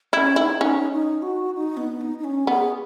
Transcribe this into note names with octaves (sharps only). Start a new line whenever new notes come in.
C#4 E4
D#4 E4
C#4 D#4
D#4
F#4
D#4
B3
D#4
D#4
C#4
B3 G#4